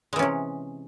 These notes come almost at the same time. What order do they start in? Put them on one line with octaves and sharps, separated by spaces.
G#3 E3 C#4 C3